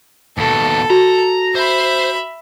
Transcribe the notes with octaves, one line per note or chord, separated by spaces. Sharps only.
D#2 B2 A4
F#4 A#5
C5 E5 B5